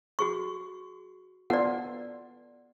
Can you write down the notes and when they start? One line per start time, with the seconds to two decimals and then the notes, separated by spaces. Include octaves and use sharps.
0.19 F#4 G#4 C#6
1.50 B3 F4 A4 D5 F#5